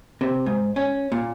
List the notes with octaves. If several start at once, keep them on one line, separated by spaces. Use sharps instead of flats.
C3
G#2
C#4
A#2